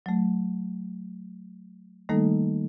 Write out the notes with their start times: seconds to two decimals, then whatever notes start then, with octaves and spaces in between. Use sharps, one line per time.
0.06 F#3 A3
2.09 D#3 G3 A3 A#3 D#4 A4